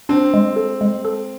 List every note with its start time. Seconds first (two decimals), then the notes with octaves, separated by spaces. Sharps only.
0.09 C4 D4
0.34 G#3
0.56 A4
0.81 G#3
1.05 A4